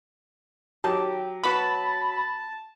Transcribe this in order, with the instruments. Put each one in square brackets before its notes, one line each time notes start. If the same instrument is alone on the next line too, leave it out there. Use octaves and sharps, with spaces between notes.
[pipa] D#3 A5 [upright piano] F#3 [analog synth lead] G4
[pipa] B3 F#4 B4 [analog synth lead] A5 [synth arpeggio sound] B5